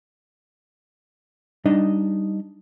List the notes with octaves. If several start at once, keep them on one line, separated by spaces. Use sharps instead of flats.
G3 D4 D#4 D#5